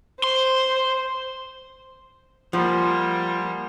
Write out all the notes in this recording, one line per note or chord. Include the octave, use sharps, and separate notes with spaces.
C5 C6
F3 G3 A#3 G#4 C5 F#5